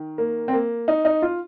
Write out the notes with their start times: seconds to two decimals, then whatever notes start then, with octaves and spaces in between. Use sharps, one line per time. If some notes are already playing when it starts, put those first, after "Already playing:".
Already playing: D#3
0.18 A#3
0.48 C4
0.53 A#3
0.88 D#4
1.05 D#4
1.22 F4